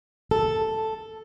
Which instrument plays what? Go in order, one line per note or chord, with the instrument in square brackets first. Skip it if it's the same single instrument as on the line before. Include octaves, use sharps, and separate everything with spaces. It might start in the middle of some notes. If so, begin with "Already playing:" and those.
[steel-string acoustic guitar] A4